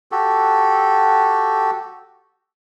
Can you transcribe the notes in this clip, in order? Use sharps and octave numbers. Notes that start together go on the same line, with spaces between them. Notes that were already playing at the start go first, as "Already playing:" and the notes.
F#4 G4 A4